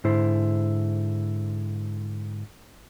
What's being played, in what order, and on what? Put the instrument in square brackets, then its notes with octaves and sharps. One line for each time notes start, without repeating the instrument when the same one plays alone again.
[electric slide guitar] G#2 D3 E4 C5